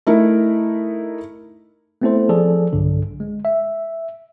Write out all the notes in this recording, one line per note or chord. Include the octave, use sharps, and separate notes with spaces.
A3 D#4 E4 A#4
A3 B3 C4 E4 A4 C5
F3 G#4 A4 D5
B1 G2 D3
G#3
E5